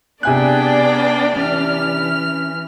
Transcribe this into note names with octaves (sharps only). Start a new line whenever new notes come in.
C3 B3 D4 G#4 D5 G5 G#5 F#6
E3 C#4 F6